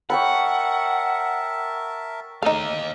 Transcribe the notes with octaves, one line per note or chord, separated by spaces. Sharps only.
A#4 C#5 E5 F#5 G5 A5 B5
A3 D#4 D#5 F5